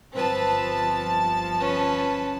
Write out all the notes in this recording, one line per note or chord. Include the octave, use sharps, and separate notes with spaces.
G1 F3 C4 B4 A5
C#4 B4